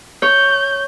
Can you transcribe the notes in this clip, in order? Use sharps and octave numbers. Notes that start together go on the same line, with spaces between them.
C#5 G6